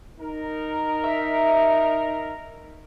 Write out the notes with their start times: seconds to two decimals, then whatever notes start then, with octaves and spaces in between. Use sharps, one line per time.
0.20 D#4 A#4
1.04 E5